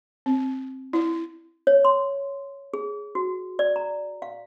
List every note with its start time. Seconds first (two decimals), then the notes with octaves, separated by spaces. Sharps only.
0.26 C4
0.93 E4
1.67 C#5
1.85 C6
2.74 G#4
3.15 F#4
3.59 D5
3.76 A#5
4.22 F5